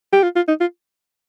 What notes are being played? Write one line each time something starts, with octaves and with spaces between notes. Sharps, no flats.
G4
F4
F4
D#4
F4